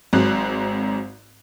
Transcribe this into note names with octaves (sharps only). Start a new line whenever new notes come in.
G#1 G#2 F#3 C4 F#6